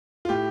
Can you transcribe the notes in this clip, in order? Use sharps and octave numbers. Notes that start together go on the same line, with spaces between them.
F4
A2 G4